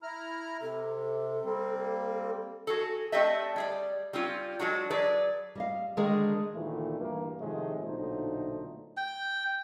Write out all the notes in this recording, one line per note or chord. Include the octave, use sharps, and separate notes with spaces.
E4 A#5 F6
C3 A4
G3 A#3 C4
F#4 G#4 A4
A3 C4 D4 G4 D#5 E5
G3 G#4 D5
G3 C4 C#4 F4
F#3 G#3 D4 F#4
F#3 G#4 B4 D5
G3 D#5 F5
D3 D#3 G#3 G#4 A#4
D2 A#2 D#3 E3 A3
D2 G2 E3 A#3
A2 C3 D#3 F3 G#3 A3
B1 A#2 D3 A3 D#4 C5
G5